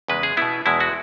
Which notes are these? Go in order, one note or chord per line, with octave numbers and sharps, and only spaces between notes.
E2 C#3 G#3 B4
G#4
B2 B3 E4
E2 B2 G#3 E4
F#4